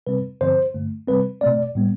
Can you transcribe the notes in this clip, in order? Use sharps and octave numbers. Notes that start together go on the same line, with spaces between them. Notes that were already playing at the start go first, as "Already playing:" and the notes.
C3 G3 C4 B4
G2 D3 F3 C4 C5
G2 D3 A3
C3 G3 C4 B4
B2 A3 C4 D5
A2 G3 B3